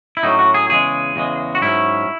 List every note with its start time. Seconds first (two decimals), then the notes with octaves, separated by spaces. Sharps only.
0.17 E4
0.23 A2 F#3 C#4 D#4
0.39 F#4
0.54 G#4
0.70 E2 C#3 G#3 G#4
1.16 E2 C#3 G#3
1.55 F#4
1.62 G#2 F#3 C#4 E4